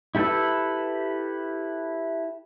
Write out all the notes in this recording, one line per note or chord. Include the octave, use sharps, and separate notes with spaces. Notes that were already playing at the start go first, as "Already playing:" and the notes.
E4 G4 A4 B4 E6